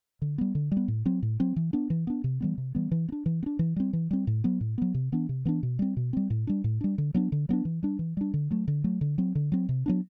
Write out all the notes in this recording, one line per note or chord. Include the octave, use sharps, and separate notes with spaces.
D3
G3 B3
D3
G3
B3
A2
F#3 C4
A2
F#3 C4
E3
B3 D4
E3
B3 D4
C3
E3 G3 B3
C3
E3 G3 B3
E3
B3
D4
E3
B3
D4
E3
G3 C4
E3
G3 C4
A2
F#3 B3
A2
F#3 B3
C3
E3 B3 D4
C3
E3 B3 D4
B2
G3 C4
B2
G3 C4
A2
G3 D4
A2
G3 D4
D3
F#3 B3 D4
D3
F#3 B3 D4
E3
G3 D4
E3
G3 D4
D3
F#3 A3
D3
F#3 A3
D3
F#3 C4
D3
F#3 C4
C3
F#3 B3 D4